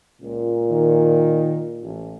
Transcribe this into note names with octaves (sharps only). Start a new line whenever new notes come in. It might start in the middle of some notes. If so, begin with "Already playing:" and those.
C#2 A#2
D#3
A1